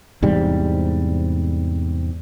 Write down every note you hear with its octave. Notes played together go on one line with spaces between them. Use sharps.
E2 G#2 C3 G3